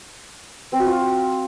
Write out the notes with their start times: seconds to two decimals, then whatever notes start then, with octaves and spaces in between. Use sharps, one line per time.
0.72 C4
0.79 F#4
0.86 F4